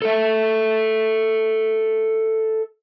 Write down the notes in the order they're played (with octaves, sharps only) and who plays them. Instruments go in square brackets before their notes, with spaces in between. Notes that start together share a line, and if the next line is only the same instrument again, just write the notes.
[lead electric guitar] A4 E5